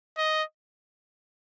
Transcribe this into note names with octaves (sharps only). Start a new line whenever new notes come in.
D#5